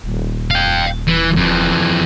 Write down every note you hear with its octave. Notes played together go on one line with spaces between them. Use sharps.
D#1
F5 G5
E3
F2 E3